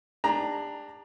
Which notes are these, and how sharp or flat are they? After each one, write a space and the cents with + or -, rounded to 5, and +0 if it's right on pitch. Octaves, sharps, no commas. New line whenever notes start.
D4 +10 G4 +45 A#5 +0